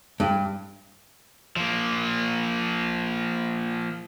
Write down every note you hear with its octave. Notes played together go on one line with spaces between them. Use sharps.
G2
F3 A#3